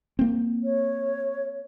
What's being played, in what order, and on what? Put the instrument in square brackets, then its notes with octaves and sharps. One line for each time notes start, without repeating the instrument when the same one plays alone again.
[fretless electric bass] A#3 C4
[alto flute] C#5